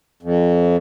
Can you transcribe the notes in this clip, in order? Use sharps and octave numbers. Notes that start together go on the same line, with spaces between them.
F2